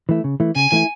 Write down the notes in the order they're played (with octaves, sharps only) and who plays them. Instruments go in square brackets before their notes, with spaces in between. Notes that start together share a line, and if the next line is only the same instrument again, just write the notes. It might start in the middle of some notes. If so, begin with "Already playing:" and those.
[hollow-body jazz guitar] E3 A3 E4
C#3
E3 A3 E4
[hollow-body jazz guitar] C#3 [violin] G#5
[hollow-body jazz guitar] E3 A3 E4